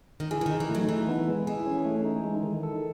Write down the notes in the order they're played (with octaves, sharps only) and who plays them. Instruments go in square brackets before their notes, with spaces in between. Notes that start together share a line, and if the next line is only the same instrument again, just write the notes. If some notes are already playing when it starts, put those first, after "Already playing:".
[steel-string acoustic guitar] D#3
[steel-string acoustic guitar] E3 [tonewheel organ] G#4
[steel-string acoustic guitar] E3
[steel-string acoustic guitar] D#3 [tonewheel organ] D#4
[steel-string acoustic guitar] E3
[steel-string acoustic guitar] F#3 [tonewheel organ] A3
[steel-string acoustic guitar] E3 [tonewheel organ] D#4
[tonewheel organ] B3
G#3
[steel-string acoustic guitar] E3 [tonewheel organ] G#4
[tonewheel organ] C#4
A3
D#4
G#3
D#3
A4